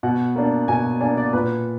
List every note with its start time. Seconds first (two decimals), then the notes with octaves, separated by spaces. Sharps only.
0.03 B2 F#5
0.36 A#3 D4
0.68 B2 G#5
1.01 A#3 D4 G#5
1.17 D5
1.33 A#2 B4